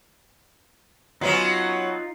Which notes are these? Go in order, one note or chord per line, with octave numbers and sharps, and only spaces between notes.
F#3 B3 C#4 D#4 F4